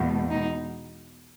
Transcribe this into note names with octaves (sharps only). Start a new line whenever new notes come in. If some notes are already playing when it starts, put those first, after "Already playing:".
Already playing: E2 B2 G#3
D#4